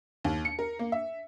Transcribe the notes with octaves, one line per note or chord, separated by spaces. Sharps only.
D#2
C#7
A#4
A#3
E5